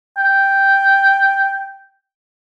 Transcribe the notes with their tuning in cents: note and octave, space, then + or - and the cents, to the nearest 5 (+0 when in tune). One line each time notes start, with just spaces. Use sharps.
G5 +0